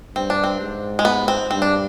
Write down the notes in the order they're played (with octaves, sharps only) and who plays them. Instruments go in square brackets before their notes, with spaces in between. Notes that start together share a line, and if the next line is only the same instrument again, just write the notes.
[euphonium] G2 [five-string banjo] C4
[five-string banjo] D4
C4
[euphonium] G#2
[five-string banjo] G#3
B3
C4
[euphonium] G2 [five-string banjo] C4
[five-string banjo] D4